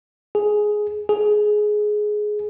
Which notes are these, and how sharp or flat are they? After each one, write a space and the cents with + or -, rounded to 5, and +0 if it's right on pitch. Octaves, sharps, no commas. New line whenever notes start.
G#4 +10
G#4 +15